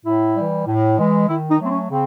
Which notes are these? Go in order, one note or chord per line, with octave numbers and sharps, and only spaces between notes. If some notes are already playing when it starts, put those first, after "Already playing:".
A2 E4
E3 G3
A2
E3 G#3
D#3 E4
D#4
F#3 A3 C4
C#4
C#3 C4